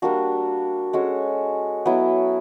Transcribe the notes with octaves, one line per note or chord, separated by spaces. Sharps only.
G3 A#3 D4 F#4
G#3 C#4 F#4 A4
F#3 B3 E4